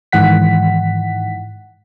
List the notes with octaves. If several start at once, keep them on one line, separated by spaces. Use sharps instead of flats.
G#2 D#3 E3 F#5 B6